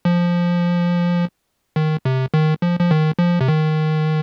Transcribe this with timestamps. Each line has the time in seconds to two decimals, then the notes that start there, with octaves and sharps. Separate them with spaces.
0.05 F3
1.76 D#3
2.05 C3
2.34 D#3
2.62 F3
2.80 F3
2.91 D#3
3.19 F3
3.41 C3
3.48 D#3